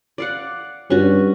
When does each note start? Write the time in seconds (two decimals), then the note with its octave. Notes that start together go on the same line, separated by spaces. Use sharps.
0.18 D5 F5 F#5
0.90 G2 C#4 F#4